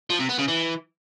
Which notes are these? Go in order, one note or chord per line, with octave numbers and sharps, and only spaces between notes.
F3
C3
B3
C#3
E3